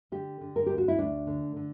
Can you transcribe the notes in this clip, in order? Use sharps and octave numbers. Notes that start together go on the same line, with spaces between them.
D3 G4
D3
A#4
D2 G4
F#4
E4
D2 D4
D3
D3